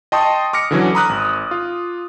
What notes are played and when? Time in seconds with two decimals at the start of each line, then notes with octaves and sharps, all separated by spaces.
0.12 D#5 G5 A5 C6 C#6 D#6
0.53 D6 F6 A#6 C#7
0.71 D3 E3 F#3 C#4
0.95 A#5 B5 D#6 F6 F#6
1.09 G#1
1.51 F4